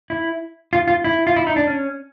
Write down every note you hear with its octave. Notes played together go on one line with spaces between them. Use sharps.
E4
F4
F4
E4
F4
E4
D#4
D4
C#4